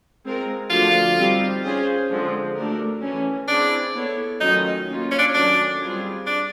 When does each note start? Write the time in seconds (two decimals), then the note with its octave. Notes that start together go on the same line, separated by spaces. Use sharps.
0.24 G#3 C4 F4 A#4
0.70 D3 F3 A3 D4 F4 F#4
1.17 G3 C4 D#4 G4
1.63 C#4 F4 G#4 C5
2.10 D3 F3 G#3 C4
2.55 A3 D4 F#4 A#4
3.02 E3 A3 C#4
3.48 C4 D4 E4 G#4
3.95 B3 E4 A4 C#5
4.41 D#3 F#3 A3 C#4 D#4 F4
4.88 A#3 C#4 F4
5.11 C#4
5.19 D4
5.34 D#3 F#3 A3 C#4 D4
5.80 G3 C4 F4 G#4
6.27 D4